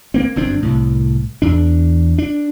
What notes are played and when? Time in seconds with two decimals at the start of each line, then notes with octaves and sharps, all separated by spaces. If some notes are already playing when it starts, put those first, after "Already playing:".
0.14 A#3 C4
0.36 G1 F#2 C4 D4
0.62 C2 A2
1.42 E2 D4
2.18 D4